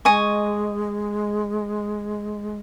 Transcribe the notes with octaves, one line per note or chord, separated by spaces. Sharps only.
G#3 D#5 G#5 C#6